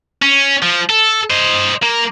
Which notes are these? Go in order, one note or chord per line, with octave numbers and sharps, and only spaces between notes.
C#4
F3
A4
C5 D#5
A#3